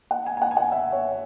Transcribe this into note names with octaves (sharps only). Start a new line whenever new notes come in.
F#5
G#5
G#5
F#5
G#5
F#5
E5
C#5